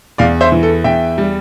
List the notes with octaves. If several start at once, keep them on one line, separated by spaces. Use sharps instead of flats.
E2 D5 F5
C5 E5
E3
A4
E2 E5 G5
G3